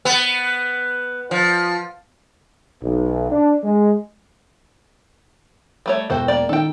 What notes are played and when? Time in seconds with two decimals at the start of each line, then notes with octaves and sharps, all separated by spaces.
0.05 B3
1.31 F3
2.82 B1
3.31 D4
3.63 G#3
5.86 G3 A3 C#5
6.10 E1 F#4 A4 C5 G5
6.28 A#3 D5
6.49 D#3 D#4 A4 G5